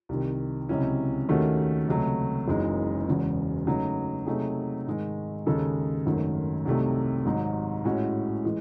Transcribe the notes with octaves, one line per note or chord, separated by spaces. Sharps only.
C2 C3 D#3
C#2 C3 F#3 C#4 E4
D#2 D#3 A3 C#4 F#4
C#2 C3 F#3 A3
F#1 F#2 E3 G#3 D#4
E1 E2 C#3 E3
C#3 F#3 A3 D#4
C3 F#3 A3 D#4 G#4
G#2 D#3 G#3
D#2 C#3 G#3 D#4 A4
G#1 F#2 D#3 A3
C2 C3 F#3 A3 D#4
G#1 G#2 F#3
A2 G#3 C#4 F#4 C#5
E3 G#3